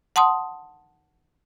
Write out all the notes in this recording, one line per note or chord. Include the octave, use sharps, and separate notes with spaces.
F#5 A5 C6 D#6